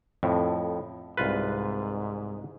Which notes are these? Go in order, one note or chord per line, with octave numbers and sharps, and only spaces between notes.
F2 A2
C2 G#2 F4 B4